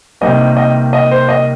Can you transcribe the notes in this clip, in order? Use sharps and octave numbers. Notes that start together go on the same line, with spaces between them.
C3 D#3 G3 A#3 D#5
D#5
D#5
C5
D#5